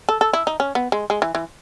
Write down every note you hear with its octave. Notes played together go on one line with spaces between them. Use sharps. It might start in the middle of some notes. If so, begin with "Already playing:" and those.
A4
A4
E4
D#4
C#4
B3
G#3
G#3
E3
E3